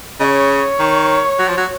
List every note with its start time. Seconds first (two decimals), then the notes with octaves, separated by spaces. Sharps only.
0.20 C#3 C#5 D#5
0.80 D#3
1.39 F#3
1.48 F3
1.57 F#3